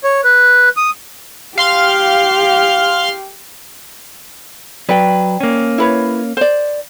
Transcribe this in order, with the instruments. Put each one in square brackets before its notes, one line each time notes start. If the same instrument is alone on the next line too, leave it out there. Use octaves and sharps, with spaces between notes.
[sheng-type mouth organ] C#5
B4
D#6
[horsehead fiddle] G4 [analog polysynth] F5 C6 F6
[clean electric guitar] F#3 B4 [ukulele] D5 G5
[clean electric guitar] A#3 C#4
[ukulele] E4 B4 C#5
C5 D5